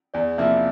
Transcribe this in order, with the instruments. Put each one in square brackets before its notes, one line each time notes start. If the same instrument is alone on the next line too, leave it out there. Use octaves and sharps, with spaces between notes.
[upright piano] E2 [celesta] D5
[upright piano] C3 F3 A#3 E4 [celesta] E5